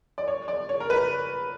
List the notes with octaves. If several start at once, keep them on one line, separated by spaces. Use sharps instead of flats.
D5
C#5
D5
C#5
A#4
B4